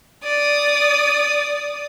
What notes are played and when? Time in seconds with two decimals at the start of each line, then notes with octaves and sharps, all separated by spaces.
0.23 D5 D#6